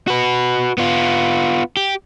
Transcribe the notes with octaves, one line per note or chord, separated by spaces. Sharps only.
F#4 B4
B3 F4
G4